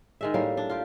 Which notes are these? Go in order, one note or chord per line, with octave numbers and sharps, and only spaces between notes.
D#3 G#3 E5
A2 G3 A#3
D4
F4 G4